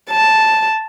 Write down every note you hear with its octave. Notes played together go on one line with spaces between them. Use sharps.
A5